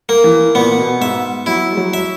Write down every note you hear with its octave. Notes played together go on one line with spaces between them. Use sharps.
A#3
E3
A#2 B3
B2
G#2 E5
F#3 E4
G#3
F#3
E5